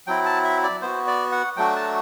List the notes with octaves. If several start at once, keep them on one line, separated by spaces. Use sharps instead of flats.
F#3 C4 E4 G5
A5
E5
D5
B3 F#4 C5
D5
F#5
F#3 A3 D4 F#4 G5
A5